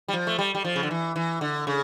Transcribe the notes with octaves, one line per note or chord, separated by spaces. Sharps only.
G3
F3
A3
G3
G3
F3
C#3
D3
E3
E3
D3
C#3